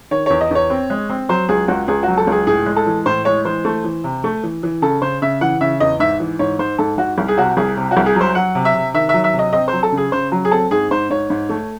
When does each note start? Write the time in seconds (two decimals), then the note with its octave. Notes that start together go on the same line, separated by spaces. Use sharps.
0.11 D#3 C#5
0.26 E2 C#5
0.41 D#5
0.51 E2 C#5
0.70 C4
0.90 G#3
1.10 C4
1.29 F#3 C5
1.49 C#2 G#4
1.68 C#2 F#4
1.88 C#2 G#4
2.03 F#3 F#4
2.17 A4
2.27 C#2 G#4
2.47 A2 G#4
2.66 G#3
2.76 A4
2.86 E3
3.06 A2 C5
3.25 G#3 C#5
3.45 E3 C5
3.65 A3
3.84 E3
4.04 C3
4.24 A3
4.43 E3
4.63 E3
4.82 C#3 A4
5.02 C#3 C5
5.22 C#3 E5
5.41 E3 F#5
5.61 C#3 E5
5.80 E2 D#5
6.00 G#2 E5
6.20 E3
6.39 G#2 C#5
6.59 G#2 C5
6.78 G#2 A4
6.98 G#2 F#4
7.18 C2
7.28 G#4
7.38 C3 F#4
7.57 C2 G#4
7.77 C3
7.91 F#4
7.97 C2
8.06 G#4
8.16 F#3
8.21 C5
8.35 F#3 F#5
8.55 C3
8.65 E5
8.74 C3
8.94 D#3 E5
9.09 F#3 E5
9.24 E5
9.33 C3
9.39 D#5
9.53 C4 D#5
9.68 C5
9.73 F#3
9.83 A4
9.92 C#3
9.97 G#4
10.12 C#3 C5
10.32 F#3
10.45 G#4
10.51 C4 A4
10.71 G#2 G#4
10.91 G#2 C5
11.10 G#2 C#5
11.30 G#2
11.49 A3